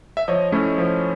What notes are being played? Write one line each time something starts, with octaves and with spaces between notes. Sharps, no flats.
E5
F3 C#5 D#5
A3 C#4 E4
F3